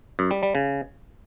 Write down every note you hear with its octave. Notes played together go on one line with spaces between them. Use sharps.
F#2
G3
G3
C#3